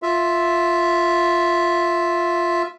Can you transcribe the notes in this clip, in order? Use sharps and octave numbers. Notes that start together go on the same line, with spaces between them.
F4 E5